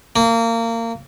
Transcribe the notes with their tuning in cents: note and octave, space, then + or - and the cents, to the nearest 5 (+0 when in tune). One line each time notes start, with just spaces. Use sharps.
A#3 -25